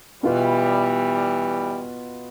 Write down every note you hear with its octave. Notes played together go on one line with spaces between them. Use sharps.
B2 E3 G3 B3 F4 B4